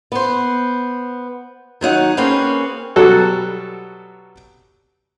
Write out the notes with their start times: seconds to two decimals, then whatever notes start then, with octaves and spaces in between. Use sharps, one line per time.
0.12 B3 C5
1.81 D#3 F#3 D#4 F#5
2.17 A#3 C4 C#4 G#4 B4
2.96 B2 F#3 G3 F#4 A4